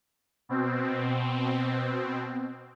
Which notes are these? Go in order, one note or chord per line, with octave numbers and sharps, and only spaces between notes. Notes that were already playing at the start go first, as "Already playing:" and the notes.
B2 C4